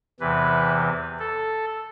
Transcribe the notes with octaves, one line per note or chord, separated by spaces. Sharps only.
E2 C3 E3 B4
A4